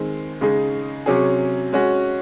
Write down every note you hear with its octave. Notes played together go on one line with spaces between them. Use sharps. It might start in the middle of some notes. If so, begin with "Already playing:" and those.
Already playing: D#3 G#3 C4
C#3 G#3 D#4 G#4
C3 F#3 C#4 G#4
G#3 C#4 F#4